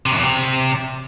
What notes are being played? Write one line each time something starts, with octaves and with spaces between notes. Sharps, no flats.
C3
F#2
E2
C3